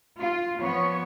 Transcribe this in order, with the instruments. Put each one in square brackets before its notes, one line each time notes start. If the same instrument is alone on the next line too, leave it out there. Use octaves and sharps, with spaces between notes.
[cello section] F4
F3 B3 C#5